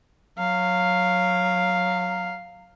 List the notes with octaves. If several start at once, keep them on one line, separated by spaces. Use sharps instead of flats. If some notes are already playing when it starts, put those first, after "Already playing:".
F#3 F5